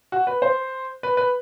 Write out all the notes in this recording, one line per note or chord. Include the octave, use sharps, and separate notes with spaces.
F#4
B4
C5
B4
B4